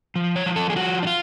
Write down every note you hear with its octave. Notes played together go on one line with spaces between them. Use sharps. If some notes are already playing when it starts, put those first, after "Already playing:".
F3
C#5
F3
A4
G#4
F3 F#4
D4
F4